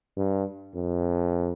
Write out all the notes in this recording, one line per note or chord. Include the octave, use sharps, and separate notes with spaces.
G2
F2